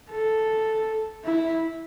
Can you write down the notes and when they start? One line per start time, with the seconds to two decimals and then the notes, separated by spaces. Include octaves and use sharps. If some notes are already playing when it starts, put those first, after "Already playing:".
0.11 A4
1.25 E4